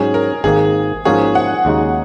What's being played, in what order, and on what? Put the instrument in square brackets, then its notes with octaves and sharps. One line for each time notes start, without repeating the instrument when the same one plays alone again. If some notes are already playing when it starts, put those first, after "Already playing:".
Already playing: [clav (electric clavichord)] G#2 F#3 C#4 [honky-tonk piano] G#4
[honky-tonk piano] A#4
[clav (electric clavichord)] G#1 G#2 D#3 A#3 [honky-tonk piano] G#4
[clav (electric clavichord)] G#2 F3 A#3 C#4 F#4 [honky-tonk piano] G#4
[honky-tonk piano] F#5
[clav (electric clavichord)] D#2 C#3 G#3 D#4 F#4